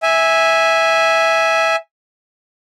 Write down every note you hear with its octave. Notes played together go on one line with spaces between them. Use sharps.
E5 G#5